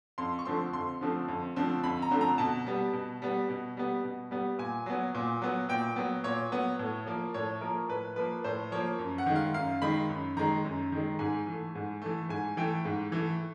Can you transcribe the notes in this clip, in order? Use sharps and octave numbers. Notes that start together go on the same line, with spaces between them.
F2 C6
C#6
D3 F3 A3 C4 C6
F2 C6
D3 F3 A3 C4
F2
D3 F3 A3 C4
F2 B5
A#5
D3 F3 A3 C4
A#5
B2 A5
G3 B3
B2
G3 B3
B2
G3 B3
B2
G3 B3
A#2 G#5
F#3 B3
A#2
F#3 B3
A#2 G5
F#3 B3
A#2 C#5
F#3 B3
A2
F3 A#3
A2 C#5
F3 A#3 A#4
A2 B4
F3 A#3 B4
A2 C5
F3 A#3 C#5
F#2
F#5
D#3 G#3
F5
F#2 F5
D#3 G#3 B5
F#2
D#3 G#3 A#5
F#2
D#3 G#3
G#2 G#5
E3 A3
G#2
E3 A3
G#2 G#5
E3 A3 G5
G#2
E3 A3